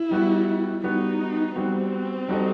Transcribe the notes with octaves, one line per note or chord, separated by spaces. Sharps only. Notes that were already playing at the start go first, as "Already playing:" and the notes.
Already playing: E4
G3 B3 F#4
G3 B3 D#4 F#4
G3 B3 C4 F#4
G3 D#4 F#4 A4 D#5